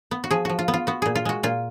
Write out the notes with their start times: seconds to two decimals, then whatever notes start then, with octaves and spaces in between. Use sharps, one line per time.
0.11 B3
0.24 F#4
0.31 F3 G#4
0.45 F3 F#4
0.59 F4
0.68 B3
0.74 F4
0.87 B3 F#4
1.02 A#2 G#4
1.15 F4
1.25 G#3 F#4
1.43 A#2 F4